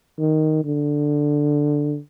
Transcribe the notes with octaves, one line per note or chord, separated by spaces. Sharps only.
D#3
D3